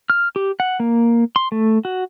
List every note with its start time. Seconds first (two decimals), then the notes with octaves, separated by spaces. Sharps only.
0.10 F6
0.36 G4
0.60 F#5
0.80 A#3
1.36 C6
1.52 A3
1.85 F#4